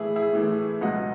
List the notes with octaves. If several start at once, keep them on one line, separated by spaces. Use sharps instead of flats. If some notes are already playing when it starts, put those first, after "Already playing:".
Already playing: A2 E3 A3 E4 G#4
E4 G#4
A2 E3 A3
C#2 B2 F#3 D#5 F#5